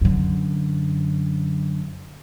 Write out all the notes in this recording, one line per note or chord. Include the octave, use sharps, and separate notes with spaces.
F#2 D3